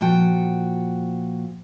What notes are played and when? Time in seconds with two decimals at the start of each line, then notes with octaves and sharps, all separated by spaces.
0.01 A#2 F3 F#4 G5